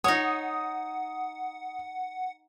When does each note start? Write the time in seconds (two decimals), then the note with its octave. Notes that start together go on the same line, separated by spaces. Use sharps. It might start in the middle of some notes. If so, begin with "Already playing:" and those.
0.04 D#4 C#5 F#5 D#6